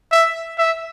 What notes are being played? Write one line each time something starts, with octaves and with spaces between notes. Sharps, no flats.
E5
E5